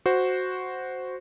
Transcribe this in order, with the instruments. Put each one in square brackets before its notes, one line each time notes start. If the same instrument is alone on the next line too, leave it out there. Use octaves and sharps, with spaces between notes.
[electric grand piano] F#4 C5